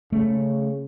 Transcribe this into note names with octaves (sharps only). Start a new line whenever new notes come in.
C#3 A3